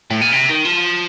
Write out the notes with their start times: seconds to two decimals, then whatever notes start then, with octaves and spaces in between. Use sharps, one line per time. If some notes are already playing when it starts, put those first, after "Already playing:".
0.11 A2
0.21 A#2
0.32 C3
0.49 D#3
0.65 F3